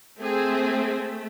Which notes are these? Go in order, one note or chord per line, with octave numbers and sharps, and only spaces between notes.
A3 C4 G#4
A3